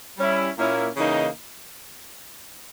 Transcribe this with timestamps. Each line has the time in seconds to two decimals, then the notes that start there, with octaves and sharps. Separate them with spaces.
0.18 G3 C#4 E4
0.57 A#2 A#3 C#4 E4
0.97 C#3 E3 A#3 D#4